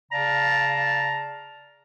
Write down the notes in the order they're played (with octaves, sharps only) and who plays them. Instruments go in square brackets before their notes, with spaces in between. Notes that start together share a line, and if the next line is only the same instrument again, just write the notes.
[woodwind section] C#3 D5 F5 A5 A#5